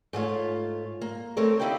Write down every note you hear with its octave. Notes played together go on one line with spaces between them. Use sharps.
G#2 A3 F4 C#5
A#3
A3 C4 A4 A#4 C#5
A#3 D#4 E4 G4 F5 G5